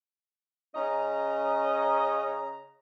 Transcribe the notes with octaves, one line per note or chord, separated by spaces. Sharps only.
C#3 C#4 D#5 A#5